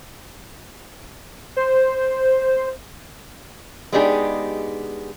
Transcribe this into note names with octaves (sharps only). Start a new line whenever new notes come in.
C5
G#3 B3 D4 D#4 G4 G#4